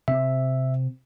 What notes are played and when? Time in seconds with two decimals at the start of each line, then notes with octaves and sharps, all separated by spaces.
0.08 C3 C4 E5